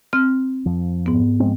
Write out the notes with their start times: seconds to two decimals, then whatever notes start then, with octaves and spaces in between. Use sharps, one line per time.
0.13 C4 F6
0.66 F2 F3
1.06 G#2 B3
1.40 F3 G#3 C4